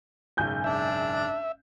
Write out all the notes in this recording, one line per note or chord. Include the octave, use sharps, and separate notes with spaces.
F#1 B1 G#2 G#5 G6
D4 E5